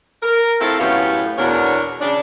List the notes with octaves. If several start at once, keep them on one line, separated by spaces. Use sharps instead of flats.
A#4
A3 C4 E4 F4 A4
F#2 A2 B3 G4 C#5 F5
E2 B2 D4 A#4 C#5
C#3 D4